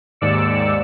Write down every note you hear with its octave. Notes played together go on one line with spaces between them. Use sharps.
D#2 G#2 D5 E6 C#7